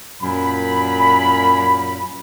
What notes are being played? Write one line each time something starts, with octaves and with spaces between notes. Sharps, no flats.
F#2 A#2 B5